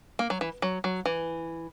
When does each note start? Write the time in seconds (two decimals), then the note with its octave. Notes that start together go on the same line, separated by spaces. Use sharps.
0.19 A#3
0.30 F#3
0.41 E3
0.62 F#3
0.84 F#3
1.05 E3